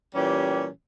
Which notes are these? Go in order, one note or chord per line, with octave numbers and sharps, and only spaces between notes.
A#2 E3 G3 C#4 G4